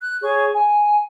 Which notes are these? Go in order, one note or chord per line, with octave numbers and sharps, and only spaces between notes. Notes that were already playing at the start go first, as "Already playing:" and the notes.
F#6
G#4 C#5 C#6
G#5